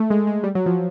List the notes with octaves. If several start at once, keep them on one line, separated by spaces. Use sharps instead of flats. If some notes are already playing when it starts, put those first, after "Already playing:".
Already playing: A3
G#3
G#3
G3
F#3
F3